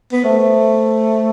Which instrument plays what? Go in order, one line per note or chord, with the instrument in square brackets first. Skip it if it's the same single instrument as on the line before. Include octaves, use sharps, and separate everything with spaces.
[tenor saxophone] B3
[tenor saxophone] A3 [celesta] C5 E5